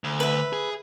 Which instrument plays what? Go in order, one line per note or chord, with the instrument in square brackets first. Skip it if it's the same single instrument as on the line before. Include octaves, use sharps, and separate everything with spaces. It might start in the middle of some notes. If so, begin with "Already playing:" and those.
[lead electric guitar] D2
[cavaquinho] B4 E5
[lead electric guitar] G#4